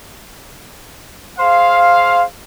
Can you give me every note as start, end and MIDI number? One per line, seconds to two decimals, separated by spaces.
1.39 2.22 68
1.39 2.22 72
1.39 2.22 77